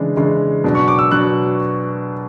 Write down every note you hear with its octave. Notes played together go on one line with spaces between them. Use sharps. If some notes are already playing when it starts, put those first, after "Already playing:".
Already playing: C#3 E3 G#3 D4
C#3 E3 G#3 D4
B2 F#3 B3 D4
C#6
D6
E6
B2 F#3 B3 D4 F#6